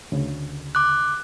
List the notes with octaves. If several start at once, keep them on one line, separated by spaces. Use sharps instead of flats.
D2 C#3
D6 F#6